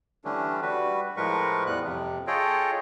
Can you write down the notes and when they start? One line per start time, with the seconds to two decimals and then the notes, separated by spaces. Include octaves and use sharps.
0.25 D3 E3 G3 A3 C#4 D4
0.62 G3 F#4 B4
1.17 A2 F3 G#3 A#4 B4 C#6
1.67 E2 A2 G3 B3 F#6
1.83 F2 C3
2.27 F4 G#4 A4 C#5 D#5 G5